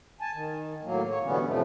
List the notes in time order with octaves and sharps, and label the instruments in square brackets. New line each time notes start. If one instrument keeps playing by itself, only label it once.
[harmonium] G#5 A5
D#3
A2 F#3 A#3
C#5
B2 D3 E3 G3 B3 C#4
F2 A2 C3 F3 A3